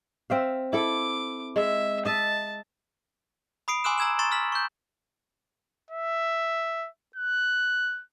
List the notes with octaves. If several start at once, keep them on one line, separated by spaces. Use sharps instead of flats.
C4 E5 F5
E4 A4 D6
G#3 E5
D#5 E5 A5
B5 D#6 C7 D7
G#5 C6 D6 E6 F#6 E7
A#5 E6 G#6 E7 F#7
A#5 C6 C#6 A6 E7
E6 F6 B6 F#7
C#6 G6
E5
F#6